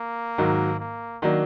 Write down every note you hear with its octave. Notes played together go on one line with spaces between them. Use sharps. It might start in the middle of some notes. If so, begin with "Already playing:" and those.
Already playing: A#3
G#2 D#3 F#3
A#3
D#3 F#3 A#3 D4